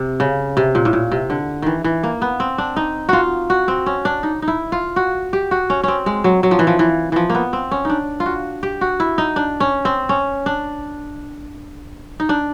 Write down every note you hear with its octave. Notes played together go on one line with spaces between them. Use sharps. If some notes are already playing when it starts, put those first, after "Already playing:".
Already playing: C3
C#3
C3
A#2
A2
A#2
C3
D3
D#3 E3
E3
A#3
B3
C4
D4
D#4
F4 F#4
F#4
C4
C#4
D4
D#4
D#4
E4
F4
F#4
G4
F#4
C#4
C4 C#4
G#3
F#3
F#3
F3
E3
F3
E3
E3 F3
A#3
B3
C4
C#4
D4 D#4
F4
F#4
G4
F#4
E4
D#4
D4
C#4
C4
C#4
D4
D#4
D4